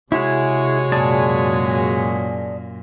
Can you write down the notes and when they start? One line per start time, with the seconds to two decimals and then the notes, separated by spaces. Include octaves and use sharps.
0.12 C3 G#3 E4 F#4 G#4 C#5
0.92 F#2 A#2 G#4 D5 A5